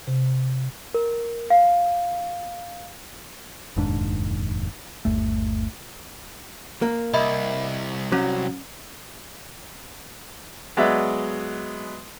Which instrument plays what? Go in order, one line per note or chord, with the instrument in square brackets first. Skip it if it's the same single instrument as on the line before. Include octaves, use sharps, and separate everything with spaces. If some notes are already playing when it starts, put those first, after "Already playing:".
[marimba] C3
[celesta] A#4
F5
[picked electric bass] F1 D#2 G#2 D4
G1 D#2 A3
[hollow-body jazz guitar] A#3
[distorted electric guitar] C2 [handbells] D#5 E5 B5
[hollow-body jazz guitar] F#3 [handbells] C#4
[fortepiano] F#3 G#3 B3 D5 E5